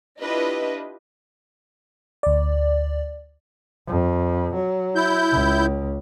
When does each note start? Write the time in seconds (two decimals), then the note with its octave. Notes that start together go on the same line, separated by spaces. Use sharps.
0.21 D4 E4 F4 G4 B4 D#5
2.23 D2 D5
3.87 F2
4.55 F#3
4.96 E4 G6
5.32 C#2